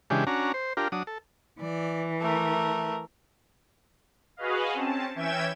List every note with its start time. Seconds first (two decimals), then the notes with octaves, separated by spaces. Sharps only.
0.10 C#3 E3 G#3 D4 G4
0.27 C#4 D4 F#4 A#5
0.54 C5
0.77 D4 F4 G4 A#4
0.92 F#3 D4 D#6
1.07 A4
1.61 E3 D5
2.21 A3 A#4
4.37 F#4 G#4 B4 D#5 F5
4.73 C4 C#4 A5
5.15 E3 C#4 E5 G5 G#6 E7